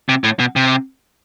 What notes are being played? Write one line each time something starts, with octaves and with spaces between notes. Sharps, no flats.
C3
A2
B2
C3